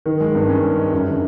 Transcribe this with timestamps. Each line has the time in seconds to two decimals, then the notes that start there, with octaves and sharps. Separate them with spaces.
0.06 D#3
0.21 G#3
0.35 G2
0.49 C#4
0.63 G#3
0.78 G#3
0.92 F#2
1.07 D3